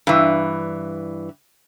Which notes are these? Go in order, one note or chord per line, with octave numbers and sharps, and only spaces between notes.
G2 E3